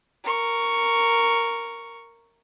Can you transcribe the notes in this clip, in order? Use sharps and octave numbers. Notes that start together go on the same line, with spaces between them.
A#4 C#6